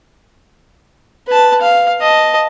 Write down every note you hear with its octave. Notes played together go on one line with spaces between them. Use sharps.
B4 A5
F5
D#5 A5